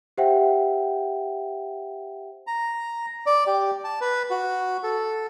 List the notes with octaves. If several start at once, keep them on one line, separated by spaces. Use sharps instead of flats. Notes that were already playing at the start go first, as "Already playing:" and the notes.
G4 C5 E5 F#5 G5
A#5
D5
G4
A5
B4
F#4
A4